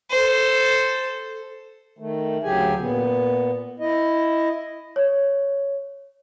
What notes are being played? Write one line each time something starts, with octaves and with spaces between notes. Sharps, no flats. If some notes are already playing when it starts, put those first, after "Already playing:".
A4 C5
D#3 A3
D2 C#3 F#3 G4 G#4 G#5
A#2 B3
E4 D#5
C#5